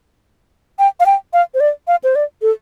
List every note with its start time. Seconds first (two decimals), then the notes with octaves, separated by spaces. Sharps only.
0.79 G5
1.00 F5
1.06 G5
1.33 F5
1.54 C5
1.60 D5
1.88 F5
2.04 C5
2.15 D5
2.42 A4